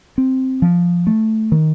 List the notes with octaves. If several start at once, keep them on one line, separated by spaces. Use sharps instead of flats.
C4
F3
A3
D#3